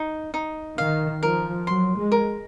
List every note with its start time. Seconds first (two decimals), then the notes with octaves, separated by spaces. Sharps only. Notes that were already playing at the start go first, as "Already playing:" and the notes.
Already playing: D#4
0.34 D#4
0.78 D#3 F5
1.22 F3 A#4
1.67 F#3 C6
1.96 G#3
2.12 A#4